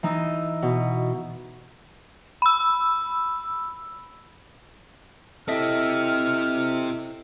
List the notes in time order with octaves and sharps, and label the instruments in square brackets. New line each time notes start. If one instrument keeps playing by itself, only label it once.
[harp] E3 D#4 E6
B2
[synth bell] B5 E6
[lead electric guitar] C4 G4 [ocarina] E4 [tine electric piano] A4 D#5 E5 [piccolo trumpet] F6